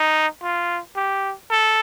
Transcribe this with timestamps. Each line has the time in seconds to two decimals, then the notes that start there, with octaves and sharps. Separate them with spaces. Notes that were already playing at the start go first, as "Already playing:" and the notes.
Already playing: D#4
0.43 F4
0.96 G4
1.50 A4